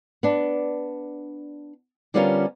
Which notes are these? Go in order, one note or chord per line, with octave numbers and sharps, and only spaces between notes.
B3 D4
D3 G3 B3 C#4 F4 A#4